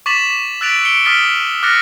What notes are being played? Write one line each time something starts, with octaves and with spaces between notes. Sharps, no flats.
C#6 D6 A6 B6 E7 F#7
E6 F#6 A6 B6 D7 F7
C#7 D7 G7
C#6 D#6 F6 A6 B6 G7
D6 F6 F#6 A6 A#6 C#7